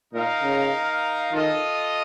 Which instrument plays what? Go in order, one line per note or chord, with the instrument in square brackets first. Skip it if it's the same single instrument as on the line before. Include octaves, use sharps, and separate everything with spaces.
[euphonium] A#2 [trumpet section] D#4 A#4 F5
[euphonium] C#3
[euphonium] D#3 [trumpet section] F4 A4 D#5